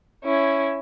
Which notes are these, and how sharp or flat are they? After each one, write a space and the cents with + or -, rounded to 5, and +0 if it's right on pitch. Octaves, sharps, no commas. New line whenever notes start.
C#4 +0 E4 +10